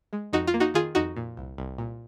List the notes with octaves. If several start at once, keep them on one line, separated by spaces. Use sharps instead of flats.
G#3
F2 D#4 F#4
F4
A#3
D#4 F#4
D#3 F4 G#4
F2 D#4 F#4
A#2
C2
C2
A#2